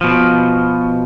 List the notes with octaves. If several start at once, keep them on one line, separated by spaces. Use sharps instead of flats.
B2 F3